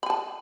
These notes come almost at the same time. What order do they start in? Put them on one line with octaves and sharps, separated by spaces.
B5 G#5 A5